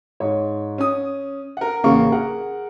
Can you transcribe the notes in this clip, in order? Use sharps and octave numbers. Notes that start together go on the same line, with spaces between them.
G#2 C#5
C#4 D#6
A#4 F#5
A1 C#3 A#3 C#6
G#4 A#4 F#5